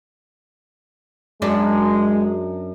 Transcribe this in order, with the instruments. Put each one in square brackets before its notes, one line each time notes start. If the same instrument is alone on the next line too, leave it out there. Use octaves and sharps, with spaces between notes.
[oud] F#2 D4 [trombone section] G#3